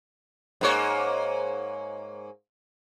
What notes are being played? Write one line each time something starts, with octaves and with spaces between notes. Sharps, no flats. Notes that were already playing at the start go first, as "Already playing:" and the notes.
G#2 A#3 C#5